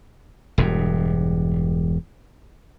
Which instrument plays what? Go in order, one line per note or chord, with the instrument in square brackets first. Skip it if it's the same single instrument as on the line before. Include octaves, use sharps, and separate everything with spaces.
[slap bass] E1 G2